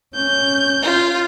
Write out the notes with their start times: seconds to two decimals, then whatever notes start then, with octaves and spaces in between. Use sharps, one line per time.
0.15 C#4 G6
0.81 F4